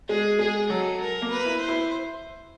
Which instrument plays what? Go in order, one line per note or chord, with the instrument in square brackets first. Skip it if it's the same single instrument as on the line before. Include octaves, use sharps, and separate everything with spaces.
[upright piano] G#3 [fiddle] G#4
[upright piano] G#3 [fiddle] G#4
[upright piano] F#3 [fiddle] A4
[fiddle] A#4
[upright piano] A#3
[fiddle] B4
[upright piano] E4
[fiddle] C5
[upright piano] E4